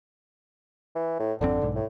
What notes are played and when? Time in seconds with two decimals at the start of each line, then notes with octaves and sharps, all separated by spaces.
0.95 E3
1.19 A2
1.41 G#1 F2 D3 C4
1.62 B1 G#2
1.75 A2